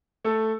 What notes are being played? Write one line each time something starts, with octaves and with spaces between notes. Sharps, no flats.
A3 A4